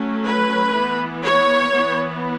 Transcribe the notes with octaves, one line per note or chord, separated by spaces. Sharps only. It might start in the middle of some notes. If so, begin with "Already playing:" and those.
Already playing: F#3 A3 C#4
B4
E3 B3
C#5
E3 B3